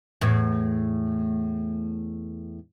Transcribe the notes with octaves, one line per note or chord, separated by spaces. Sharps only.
E2 A2